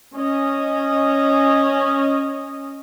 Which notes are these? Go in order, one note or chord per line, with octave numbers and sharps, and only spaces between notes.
C#4 D#5